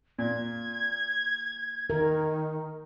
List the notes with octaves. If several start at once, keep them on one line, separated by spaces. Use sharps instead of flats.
A#2 G#6
D#3 A#4